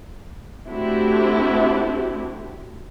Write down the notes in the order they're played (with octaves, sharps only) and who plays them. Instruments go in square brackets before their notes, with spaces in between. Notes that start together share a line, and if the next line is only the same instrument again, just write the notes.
[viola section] A3 C4 D4 E4 F#4 G4